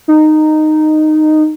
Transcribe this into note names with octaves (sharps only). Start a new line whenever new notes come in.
D#4